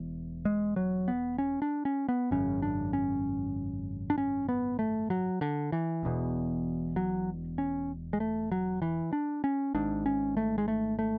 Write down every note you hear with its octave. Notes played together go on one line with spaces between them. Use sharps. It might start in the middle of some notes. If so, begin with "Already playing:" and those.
Already playing: E1 E2
G#3
F#3
B3
C#4
D4
C#4
B3
G#1 F#2 C#3 C#4
D4
C#4
D4
C#4
B3
A3
F#3
D3
E3
E1 E2 B2
F#3
C#4
G#3
A3
F#3
E3
D4
C#4
G#1 G#2 D4
C#4
A3
G#3
A3
A3